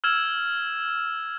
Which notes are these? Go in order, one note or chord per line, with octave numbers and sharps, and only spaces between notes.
E6 F6 G#6 E7